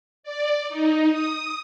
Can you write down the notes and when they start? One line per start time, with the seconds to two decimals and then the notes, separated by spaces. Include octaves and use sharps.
0.23 D5
0.69 D#4
1.12 D#6